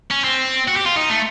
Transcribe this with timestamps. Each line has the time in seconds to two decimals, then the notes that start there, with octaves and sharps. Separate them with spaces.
0.11 C#4
0.24 C4
0.68 F#4
0.76 G4
0.86 F4
0.96 D#4
1.10 A3